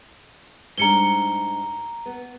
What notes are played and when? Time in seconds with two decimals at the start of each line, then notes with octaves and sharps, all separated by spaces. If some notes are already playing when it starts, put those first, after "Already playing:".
0.78 G#2 G3 D4 A#5 C#7 G7
2.06 B3